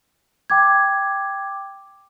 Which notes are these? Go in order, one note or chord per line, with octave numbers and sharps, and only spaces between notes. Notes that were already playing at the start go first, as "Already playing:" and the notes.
G5 D6 G#6